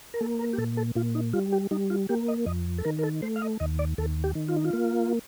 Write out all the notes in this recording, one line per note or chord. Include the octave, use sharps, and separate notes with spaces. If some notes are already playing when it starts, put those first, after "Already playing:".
A#4
A#3 A4
A#4
G4
A#2 A4
A4
A#2 F4
D#4
G3 F4
G4
G3 D#4
F4
A#3 G4
D#5
F2 D#5
A4
D#3 A#4
A#4
A4
A3 C5
F5
D#5
D#2 D#5
D5
D#2 A4
G4
D#3
F4
D#4
F4
A#3